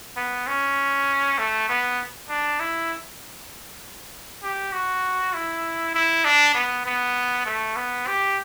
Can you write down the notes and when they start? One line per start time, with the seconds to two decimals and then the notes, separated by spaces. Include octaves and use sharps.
0.17 B3
0.48 C#4
1.38 A3
1.69 B3
2.29 D4
2.60 E4
4.43 G4
4.73 F#4
5.34 E4
5.95 E4
6.25 D4
6.55 B3
6.86 B3
7.46 A3
7.76 B3
8.07 G4